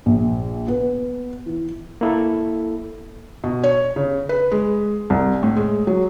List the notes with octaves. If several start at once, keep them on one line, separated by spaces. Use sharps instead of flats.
A#1
B3
E3
A#3 E4 A4
B2
C#5
C#3
B4
G#3
C2
A2
G#3
F#3